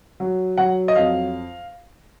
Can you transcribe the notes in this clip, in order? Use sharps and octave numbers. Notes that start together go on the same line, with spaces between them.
F#3
F#3 F#5
D#5
F2 F5